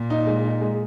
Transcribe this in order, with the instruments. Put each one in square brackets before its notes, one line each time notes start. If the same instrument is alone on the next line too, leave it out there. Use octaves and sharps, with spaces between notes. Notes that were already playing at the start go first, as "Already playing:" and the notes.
Already playing: [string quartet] A#2
[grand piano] D#4
G#3
D#4
G#3